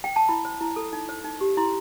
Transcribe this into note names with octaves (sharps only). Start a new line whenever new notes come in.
G5
A5
E4 B5
C5
E4
A4
D#4
C5
D#4
G4
E4 C6